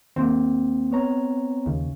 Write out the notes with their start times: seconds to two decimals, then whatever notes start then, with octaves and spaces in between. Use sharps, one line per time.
0.16 D#2 A#3 C4
0.91 B3 C#5 A#5
1.66 D#2 C#3